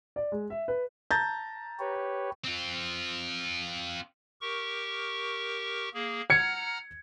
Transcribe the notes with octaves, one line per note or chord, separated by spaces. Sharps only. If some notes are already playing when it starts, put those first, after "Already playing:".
D5
G#3
E5
B4
A5 A#5 G6 A6
G4 B4 C#5
C4 F4
G4 A#4 C#6
A#3 G#4
F#5 A#5 F6 G#6 C#7